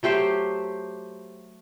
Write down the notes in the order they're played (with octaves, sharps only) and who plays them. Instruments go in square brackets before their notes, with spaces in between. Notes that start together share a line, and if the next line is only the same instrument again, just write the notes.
[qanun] F#3 A3 G4 C5